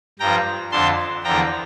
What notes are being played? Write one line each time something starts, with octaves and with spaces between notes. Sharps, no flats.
G2 F3 G5 A#5
F2 D3 F3 A5 C6
E2 D3 F3 G5 A#5